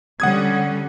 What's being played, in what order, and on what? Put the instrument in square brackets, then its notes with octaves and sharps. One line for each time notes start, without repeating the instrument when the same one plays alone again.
[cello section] D3 G3 C#4 [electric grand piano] F#5 D#6 G#6